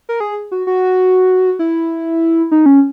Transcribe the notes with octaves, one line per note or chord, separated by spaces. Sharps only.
A#4
G#4
F#4
F#4
E4
D#4
C#4